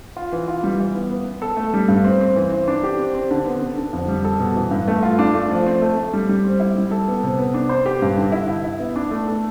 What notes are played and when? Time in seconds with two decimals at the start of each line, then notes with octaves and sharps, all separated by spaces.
0.17 F4
0.32 E3
0.48 F4
0.63 G3
0.79 E3
0.94 B3
1.11 B3
1.25 B3
1.42 A4
1.57 A3
1.74 G3
1.88 G2
2.04 C4
2.21 C4
2.36 E3
2.52 C4
2.68 D4
2.84 G4
2.99 C4
3.15 C4
3.31 D3
3.46 B3
3.61 D3
3.77 D3
3.93 F2
4.08 G3
4.25 A4
4.39 B2
4.56 E3
4.71 G2
4.88 A3
5.03 F4
5.19 D4
5.34 A3
5.51 F3
5.66 C4
5.82 A3
5.97 A3
6.13 G3
6.29 G3
6.44 C4
6.60 E4
6.75 G3
6.91 A4
7.08 B3
7.23 C3
7.38 B3
7.54 D4
7.69 C5
7.86 G4
8.02 G2
8.17 D3
8.32 E4
8.49 E4
8.64 E4
8.79 B3
8.96 D4
9.11 A3
9.27 A4